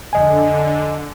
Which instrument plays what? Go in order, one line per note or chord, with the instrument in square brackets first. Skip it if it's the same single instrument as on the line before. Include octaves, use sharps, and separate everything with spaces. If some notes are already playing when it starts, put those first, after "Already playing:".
[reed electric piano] F2 D#5 G#5 [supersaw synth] D3